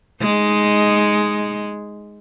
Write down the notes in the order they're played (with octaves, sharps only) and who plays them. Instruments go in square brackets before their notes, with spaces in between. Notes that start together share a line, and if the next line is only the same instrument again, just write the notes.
[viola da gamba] G#3 D#4